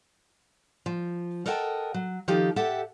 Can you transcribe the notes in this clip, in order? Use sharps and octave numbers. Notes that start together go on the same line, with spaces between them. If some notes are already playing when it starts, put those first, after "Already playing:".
F3
A4 A#4 D#5 F#5 G5 A5
F#3
D#3 F3 D#4 G4 A4
G4 A4 E5 F#5 G5